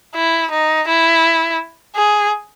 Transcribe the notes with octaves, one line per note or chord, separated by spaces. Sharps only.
E4
D#4
E4
G#4